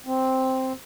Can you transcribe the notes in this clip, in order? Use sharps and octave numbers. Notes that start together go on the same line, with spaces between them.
C4